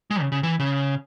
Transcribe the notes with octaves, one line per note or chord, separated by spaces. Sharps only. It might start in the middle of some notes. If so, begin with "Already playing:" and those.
G#3
C#3
C#3
E3
C#3